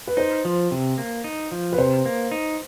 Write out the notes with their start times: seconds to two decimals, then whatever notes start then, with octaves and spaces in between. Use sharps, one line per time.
0.07 B4
0.17 D#4 C5
0.45 F3
0.71 C3
0.98 A#3
1.24 D#4
1.52 F3
1.72 B4
1.78 C3 C5
2.05 A#3
2.32 D#4